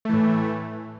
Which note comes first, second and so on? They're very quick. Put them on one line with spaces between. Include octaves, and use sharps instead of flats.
A3 E3 A2